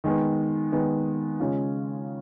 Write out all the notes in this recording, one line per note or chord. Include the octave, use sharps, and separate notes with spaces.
D#3 G#3 B3
D#3 G#3 B3
C#3 G#3 C#4 F4